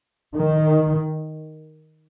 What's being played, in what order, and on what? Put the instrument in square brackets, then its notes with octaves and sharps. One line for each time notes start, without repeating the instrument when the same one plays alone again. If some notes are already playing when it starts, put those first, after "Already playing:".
[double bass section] D#3